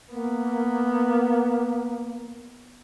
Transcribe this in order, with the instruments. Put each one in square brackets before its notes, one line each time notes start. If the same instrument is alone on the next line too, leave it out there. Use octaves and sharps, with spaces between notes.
[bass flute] A#3 [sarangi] B3